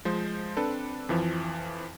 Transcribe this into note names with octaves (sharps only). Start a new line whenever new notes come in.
F3 G#3 C5
C4 D4 A4 B4
F2 E3 F3